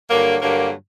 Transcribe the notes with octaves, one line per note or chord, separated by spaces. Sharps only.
G2 D3 F#3 A#3
G2 D3 F#3 A#3